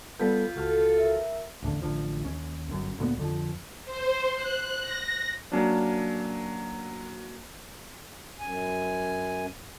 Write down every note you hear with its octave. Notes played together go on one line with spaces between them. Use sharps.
G3 B3 F4 A4 G6 B6
C#2 F#4 A4 F6
A#4 E5
A1 E2 D3
A1 D3 F3
D#2 C#4
G1 F#2
D2 A#2 F#3 B3
F2 D3 F3
C5
F#6
A#6
F#3 A#3 C#4 D4
F#2 G#5